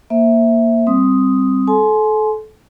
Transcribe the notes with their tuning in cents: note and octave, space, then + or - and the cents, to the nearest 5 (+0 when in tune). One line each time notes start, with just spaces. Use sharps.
A#3 +0 C5 +0 E5 +0
G3 +0 C4 +5 D#6 +0
A4 -25 G#5 +35 C6 +0